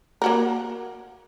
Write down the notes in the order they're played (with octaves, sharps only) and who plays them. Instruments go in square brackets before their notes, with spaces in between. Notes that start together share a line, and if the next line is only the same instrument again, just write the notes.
[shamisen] A#3 F#4 A#4